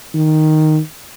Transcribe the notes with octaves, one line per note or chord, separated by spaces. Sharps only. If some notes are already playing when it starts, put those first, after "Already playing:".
D#3